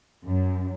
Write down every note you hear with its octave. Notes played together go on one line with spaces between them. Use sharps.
F#2